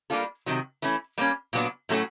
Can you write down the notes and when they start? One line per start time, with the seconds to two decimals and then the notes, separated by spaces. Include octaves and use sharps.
0.10 G3 A#3 D4 F4 A4
0.46 C3 D#3 F#3
0.82 E3 A3 C#4 E4
1.18 G3 A#3 C#4
1.53 A#2 F#3 B3 D4
1.89 A2 F#3 A3 C#4 F#4